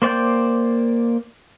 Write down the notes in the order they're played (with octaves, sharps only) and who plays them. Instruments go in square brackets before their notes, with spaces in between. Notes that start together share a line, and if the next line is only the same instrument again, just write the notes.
[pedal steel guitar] A#3 C5 D5 G5 G6